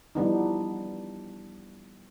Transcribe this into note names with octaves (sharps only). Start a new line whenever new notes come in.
E3 F3 G3 B3 D4 D#4